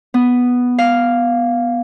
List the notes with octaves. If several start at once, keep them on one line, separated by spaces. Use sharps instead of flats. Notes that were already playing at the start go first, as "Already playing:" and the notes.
B3
F5